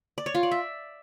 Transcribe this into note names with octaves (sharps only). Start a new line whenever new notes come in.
D5
C#5
F4
D5
E5